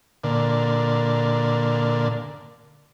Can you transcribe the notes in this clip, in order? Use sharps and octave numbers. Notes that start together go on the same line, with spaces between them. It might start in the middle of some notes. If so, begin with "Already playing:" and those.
A#2 D3